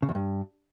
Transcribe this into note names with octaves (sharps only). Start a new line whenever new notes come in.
C#3
E2
G2